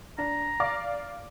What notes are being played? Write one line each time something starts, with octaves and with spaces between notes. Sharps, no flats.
D4 A#5
D5 F5 D6